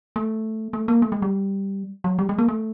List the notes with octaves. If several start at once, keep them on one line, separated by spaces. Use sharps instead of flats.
A3
A3
A#3
A3
G#3
G3
F#3
G3
G#3
A#3
A3